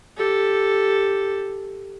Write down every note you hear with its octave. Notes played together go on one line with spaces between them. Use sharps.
G4 A4